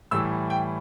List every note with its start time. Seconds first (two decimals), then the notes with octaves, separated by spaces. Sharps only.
0.11 A2 E3 G3 E6
0.50 G5